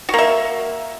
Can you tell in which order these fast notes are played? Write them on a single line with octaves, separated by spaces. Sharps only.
F#4 A#3 E5